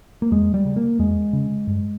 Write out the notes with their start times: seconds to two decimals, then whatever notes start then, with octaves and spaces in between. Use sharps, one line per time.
0.22 A#3
0.31 E2 G#3
0.54 G3
0.65 C#3
0.76 A#3
0.99 E2 G#3
1.33 C#3
1.67 G2